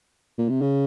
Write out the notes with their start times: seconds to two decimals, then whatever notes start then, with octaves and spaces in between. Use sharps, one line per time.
0.38 A#2
0.49 C3
0.61 C#3